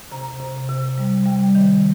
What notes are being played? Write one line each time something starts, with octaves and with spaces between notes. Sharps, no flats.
C3 A#5
C3
C3
G3
G3
D#3